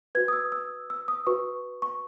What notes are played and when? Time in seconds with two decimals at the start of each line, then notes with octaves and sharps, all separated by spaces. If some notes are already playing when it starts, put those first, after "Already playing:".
0.15 F#4 B4 G#6
0.28 D#6
0.33 E6
0.52 E6
0.90 E6
1.08 D#6
1.27 F#4 B4 C#6
1.82 C#6